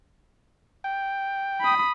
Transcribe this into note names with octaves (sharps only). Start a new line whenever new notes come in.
G5
B5 D#6